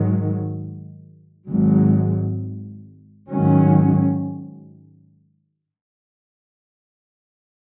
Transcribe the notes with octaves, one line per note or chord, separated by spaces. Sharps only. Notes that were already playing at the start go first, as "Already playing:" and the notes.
Already playing: G#2 D#3 F#3
G#1 G#2 F#3
G#2 D#3 F#3 C#4